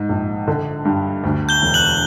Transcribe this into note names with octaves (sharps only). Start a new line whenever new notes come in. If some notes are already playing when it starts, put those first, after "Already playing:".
Already playing: G#2
A#1
D3
G2
D2
G6 G7
E1
F#6 F#7